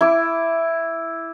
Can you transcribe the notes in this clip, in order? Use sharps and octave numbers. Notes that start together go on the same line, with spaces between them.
E4 D6